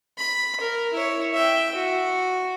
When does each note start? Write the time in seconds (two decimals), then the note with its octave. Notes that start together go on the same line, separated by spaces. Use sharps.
0.18 B5
0.61 A#4
0.93 E4 C#5
1.33 E5 G5
1.75 F#4